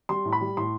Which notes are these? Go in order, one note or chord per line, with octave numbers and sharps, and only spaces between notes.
G3 C6
A2
B5
G3
A2 C6